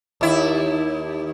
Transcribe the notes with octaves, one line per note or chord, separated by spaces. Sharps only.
D#2 E4